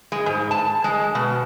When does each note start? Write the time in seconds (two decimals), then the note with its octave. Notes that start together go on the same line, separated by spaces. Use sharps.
0.12 G#3
0.26 G#2
0.51 A5
0.84 G#3
1.15 B2